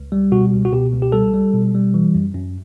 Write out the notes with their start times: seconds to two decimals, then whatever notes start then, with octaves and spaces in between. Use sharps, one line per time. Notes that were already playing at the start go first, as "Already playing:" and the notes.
Already playing: C#2
0.12 G3
0.32 B2 F#4
0.53 C#2
0.65 F#4
0.72 B2 G4
0.92 C#2
1.02 G4
1.12 G3 A4
1.34 G3
1.54 B2
1.74 G3
1.94 E3
2.15 F#2
2.34 F#2